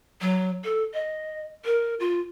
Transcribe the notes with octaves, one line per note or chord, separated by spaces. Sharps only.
F#3
A4
D#5
A#4
F4